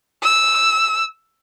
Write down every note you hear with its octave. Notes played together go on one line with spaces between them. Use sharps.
E6